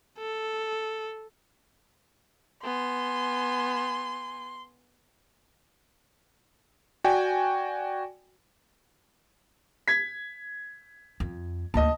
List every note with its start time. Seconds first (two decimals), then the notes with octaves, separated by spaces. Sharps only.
0.19 A4
2.64 B3 G#5 C6
7.04 F#4 D5 G5 G#5
9.88 G#6 B6
11.20 F2
11.74 D2 A#3 D#5 A5